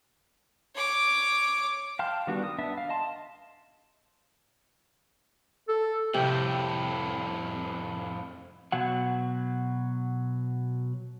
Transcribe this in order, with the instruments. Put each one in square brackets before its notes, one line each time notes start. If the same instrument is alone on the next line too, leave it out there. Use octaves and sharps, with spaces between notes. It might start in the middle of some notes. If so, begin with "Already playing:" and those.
[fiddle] C#5 D6
[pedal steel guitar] F5 G5 A5 C6 F6
D#3 G3 B3 D4 F#4
D#6
B3 D4 E5
F5
D#5 F5 A5 C6
[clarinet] A4
[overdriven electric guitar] F2 A2 [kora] C3 G4
[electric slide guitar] B2 F#3 F#5